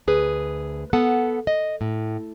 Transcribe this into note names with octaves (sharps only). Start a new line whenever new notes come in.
D2 G#4 B4
B3 A4 F#5 A5
D#5
A2